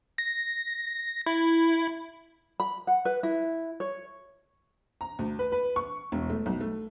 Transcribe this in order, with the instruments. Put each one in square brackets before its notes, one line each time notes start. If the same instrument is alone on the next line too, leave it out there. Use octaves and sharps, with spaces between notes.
[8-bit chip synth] A#6
E4
[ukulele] B5
F#5
B4
E4
C#5
[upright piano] A#5
D2
B4
B4
C#6
E1
A3
B1
A3